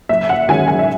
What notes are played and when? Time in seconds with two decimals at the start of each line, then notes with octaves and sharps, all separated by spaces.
0.09 F#1 E5
0.29 F#5
0.49 F#2 D#3 G#3 C#4 G#5
0.68 G#5
0.79 E5